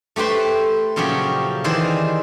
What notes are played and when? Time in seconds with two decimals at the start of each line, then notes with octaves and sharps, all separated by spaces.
0.16 A3 G4 B4 C5 G5
0.96 A#2 C#3 F3 F#3 G4
1.64 D#3 E3 G#4 C5 D5